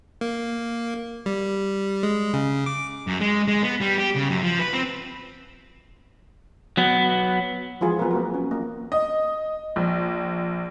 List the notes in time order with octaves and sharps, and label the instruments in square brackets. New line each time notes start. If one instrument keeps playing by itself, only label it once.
[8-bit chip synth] A#3
G3
G#3
C#3
D6
[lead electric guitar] F#2
G#3
G#3
B3
G3
G4
C#3
F#2
F3
B4
C4
F#3 B3
[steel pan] E3 F3 G#3 F4 G#4
F#3 B3 C4 F4 A#4
A#3 F#4 A#4
C#4
A#3
[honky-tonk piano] D#5
A#1